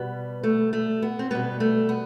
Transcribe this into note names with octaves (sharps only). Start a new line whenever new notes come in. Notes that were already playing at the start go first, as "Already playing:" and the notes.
Already playing: B2 G3 B3
A3
A3
B3
C4
B2 G3 B3
A3
B3